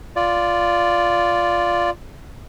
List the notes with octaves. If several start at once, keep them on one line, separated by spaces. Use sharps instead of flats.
F4 D5